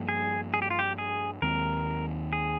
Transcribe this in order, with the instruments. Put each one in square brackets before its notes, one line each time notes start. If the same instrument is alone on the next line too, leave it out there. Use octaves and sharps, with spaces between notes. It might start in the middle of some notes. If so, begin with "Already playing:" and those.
Already playing: [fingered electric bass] G2 F3 A#3
[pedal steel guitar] G#4
G#4
G4
F4
G4
G#4
[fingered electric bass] D#2 D#3 G#3 C4 [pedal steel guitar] A#4
[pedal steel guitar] G#4